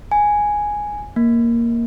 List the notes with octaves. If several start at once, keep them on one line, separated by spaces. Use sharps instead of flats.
G#5
A#3